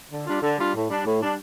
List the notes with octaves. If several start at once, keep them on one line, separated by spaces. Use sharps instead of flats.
D3
G3 D4 F4
D3
G3 D4 F4
A2
G3 D4
A2
G3 D4